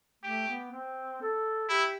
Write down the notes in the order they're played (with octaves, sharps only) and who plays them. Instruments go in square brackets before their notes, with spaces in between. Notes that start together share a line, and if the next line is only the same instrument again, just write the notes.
[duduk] A3 [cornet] G4
[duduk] B3
C4
A4
[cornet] E4 [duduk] G4